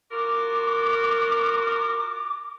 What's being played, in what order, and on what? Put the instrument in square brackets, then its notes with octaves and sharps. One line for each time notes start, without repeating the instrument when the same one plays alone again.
[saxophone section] F4 F#4 A#4 [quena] D6